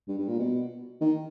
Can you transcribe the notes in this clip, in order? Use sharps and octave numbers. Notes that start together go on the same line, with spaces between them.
G2
G2
A#2
B2
D#3